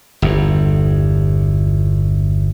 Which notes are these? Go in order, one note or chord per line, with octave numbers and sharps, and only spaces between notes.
G1 E2